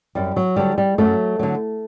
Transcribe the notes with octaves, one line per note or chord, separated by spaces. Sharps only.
F#2 G3
F#3
D3 F#3 G3
G3
F#2 F#3 A3
D3 F#3